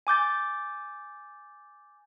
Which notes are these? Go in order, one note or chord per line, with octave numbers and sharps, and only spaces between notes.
G#5 D6 G6 A6